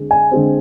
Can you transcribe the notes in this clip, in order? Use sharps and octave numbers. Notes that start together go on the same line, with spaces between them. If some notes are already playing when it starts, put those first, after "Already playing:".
Already playing: D3 G#3 C4
G#5
D3 G#3 C4